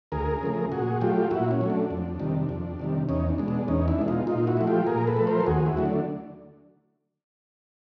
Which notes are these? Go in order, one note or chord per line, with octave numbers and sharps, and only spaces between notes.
D2 G#4 A#4
C#3 F3 A3
A#2 F#4 G#4
F#3 A3 F4 G4
A#2 E4 F#4
C#4
F#3 A3
D4
F2
C3 D#3 G3
F2
C3 D#3 G3
E2 C#4 D#4
D4
B2 G#3
D4
E2 C#4 D#4
D4 E4
B2 G#3
D#4 F4
A#2 D#4 F4
E4 F#4
F3 A3
F4 G4
A#2 G#4 A#4
A4 B4
F3 A3
A#4 C5
A4
D#2 F#4 G#4
E4 F#4
D3 F#3 A3
D4